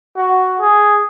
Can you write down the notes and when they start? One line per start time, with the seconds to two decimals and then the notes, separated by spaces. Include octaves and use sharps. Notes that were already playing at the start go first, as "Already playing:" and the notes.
0.17 F#4
0.60 G#4